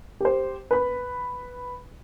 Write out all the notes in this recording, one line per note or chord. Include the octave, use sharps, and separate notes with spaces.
G4 C5
B4 B5